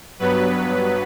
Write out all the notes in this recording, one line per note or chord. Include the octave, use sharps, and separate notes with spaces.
G2 F#3 B3 B4